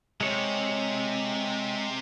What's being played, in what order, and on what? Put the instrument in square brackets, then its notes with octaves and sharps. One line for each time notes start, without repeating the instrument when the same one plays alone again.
[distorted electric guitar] C3 [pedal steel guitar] G#3 C#5